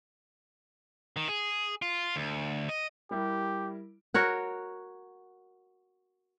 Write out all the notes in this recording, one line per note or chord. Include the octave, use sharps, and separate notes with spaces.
D#3
G#4
F4
D2
D#5
G3 E4 G4 A#4
F#4 A#4 C#5 F#5